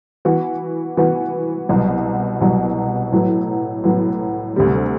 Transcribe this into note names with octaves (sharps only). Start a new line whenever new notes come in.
E3 B3 F#4
E3 B3 F#4
C2 B2 F#3
C2 B2 F#3
A2 F#3 B3
A2 F#3 B3
D2 C3 G3